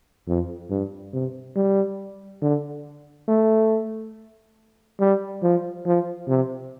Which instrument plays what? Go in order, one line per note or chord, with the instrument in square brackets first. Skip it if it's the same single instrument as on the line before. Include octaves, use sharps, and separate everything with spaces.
[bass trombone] F2
G2
C3
G3
D3
A3
G3
F3
F3
C3